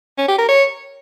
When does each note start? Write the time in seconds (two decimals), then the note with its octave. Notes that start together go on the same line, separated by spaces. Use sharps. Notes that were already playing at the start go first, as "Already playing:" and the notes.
0.18 C#4
0.28 G4
0.38 A#4
0.49 C#5